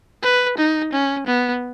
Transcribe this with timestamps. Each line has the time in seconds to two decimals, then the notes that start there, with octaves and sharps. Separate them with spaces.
0.23 B4
0.58 D#4
0.93 C#4
1.26 B3